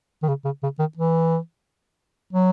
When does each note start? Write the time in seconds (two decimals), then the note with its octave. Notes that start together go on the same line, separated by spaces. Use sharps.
0.23 D#3
0.29 C#3
0.45 C#3
0.63 C#3
0.79 D#3
0.97 E3
2.33 F#3